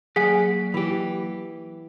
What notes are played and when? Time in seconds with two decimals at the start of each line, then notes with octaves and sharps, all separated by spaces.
0.16 F#3 A#3 G#4 D5 F#5 G#5 B6
0.74 E3 G4